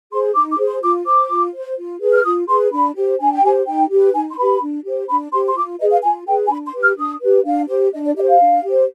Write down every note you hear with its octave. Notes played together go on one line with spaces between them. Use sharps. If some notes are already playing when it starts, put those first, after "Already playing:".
G#4 C5 C6
D#4 D6
D6
G#4 C5
C6
F4 D6
C5 D6
F4
C5
F4
G#4 B4
F6
F4 D#6
G#4 B4 C6
D4 B5
G4 C5
D4 G#5
G5
G4 C5 G#5
D#4 G5
G4 B4
D#4 G#5
C6
G4 B4 B5
D4
G4 C5
D4 B5
G4 C5 C6
C6
F4 D6
G#4 B4 D#5
F5
F4 G#5
G#4 B4 G5
G#5
D4 B5
C6
G4 B4
F6
D4 D#6
G4 B4
D4 F5
G4 C5
D4 D#5
D5
G4 C5 D#5
F5
D4
G4 C5